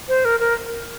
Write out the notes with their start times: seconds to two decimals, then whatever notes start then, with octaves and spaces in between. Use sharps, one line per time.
0.08 C5
0.25 A#4
0.40 A#4